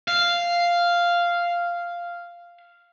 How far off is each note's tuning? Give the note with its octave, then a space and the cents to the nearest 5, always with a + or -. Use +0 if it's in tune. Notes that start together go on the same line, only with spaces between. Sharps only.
F5 -5